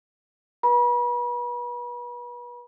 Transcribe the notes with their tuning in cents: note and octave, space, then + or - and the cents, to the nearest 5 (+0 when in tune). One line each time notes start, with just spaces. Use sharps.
B4 -30 B5 -40